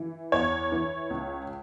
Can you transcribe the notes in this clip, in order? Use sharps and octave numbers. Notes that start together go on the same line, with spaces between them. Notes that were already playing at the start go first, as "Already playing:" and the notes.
Already playing: E3
E2 C#5
E3
C#2